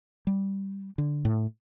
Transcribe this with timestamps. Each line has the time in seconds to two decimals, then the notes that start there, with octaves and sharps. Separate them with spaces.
0.27 G3
0.98 D3
1.25 A2